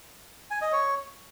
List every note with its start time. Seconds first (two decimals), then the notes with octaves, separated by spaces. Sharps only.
0.51 G#5
0.62 D#5
0.72 C#5